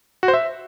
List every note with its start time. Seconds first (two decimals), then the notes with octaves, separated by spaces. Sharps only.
0.23 F#4
0.28 C5
0.34 E5